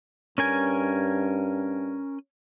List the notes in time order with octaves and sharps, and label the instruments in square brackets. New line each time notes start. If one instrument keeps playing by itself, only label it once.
[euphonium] G2 [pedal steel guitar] C#4 A#4 G#5